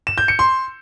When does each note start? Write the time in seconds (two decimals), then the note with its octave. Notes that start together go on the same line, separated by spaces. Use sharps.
0.07 E7
0.18 G6
0.28 C#7
0.39 C6